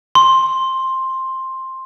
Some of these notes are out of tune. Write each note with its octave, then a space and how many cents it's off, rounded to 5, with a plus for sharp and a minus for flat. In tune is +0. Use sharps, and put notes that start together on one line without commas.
C6 +10